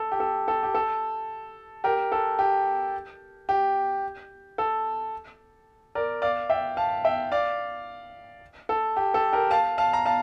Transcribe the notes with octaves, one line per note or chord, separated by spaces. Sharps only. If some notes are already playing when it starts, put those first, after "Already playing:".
Already playing: A4
G4
A4
A4
G4
A4
G4 A#4
A4
G4
G4
A4
A#4 D5
D5 F5
E5 G5
F5 A5
E5 G5
D5 F5
A4
G4
A4
G4 A#4
F5 A5
F5 A5
A#5
F5 A5